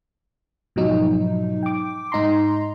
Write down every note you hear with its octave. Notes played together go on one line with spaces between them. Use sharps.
G#2 B2 F3 F#3 D#4
G5 D6
G#2 D#4 A#5 C6